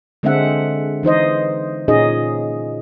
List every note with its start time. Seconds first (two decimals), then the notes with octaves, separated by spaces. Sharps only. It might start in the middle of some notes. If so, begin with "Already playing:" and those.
0.23 D3 G#3 C4 D4 E5 F#5
1.03 E3 D#4 C5 D#5
1.88 A#2 C#4 D#4 G#4 D#5